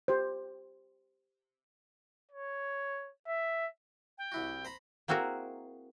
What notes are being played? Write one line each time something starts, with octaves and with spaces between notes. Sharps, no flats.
G4 C5
C#5
E5
G5
C2 E4 F#4
C5 A#5 B5
A#3 C4 E4 F#4 G#4 A#4